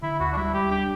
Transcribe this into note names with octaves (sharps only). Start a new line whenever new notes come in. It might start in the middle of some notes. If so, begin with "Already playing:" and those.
D3 E4
D2 F#4
D4
G3 E4
G3 G4
D4 G4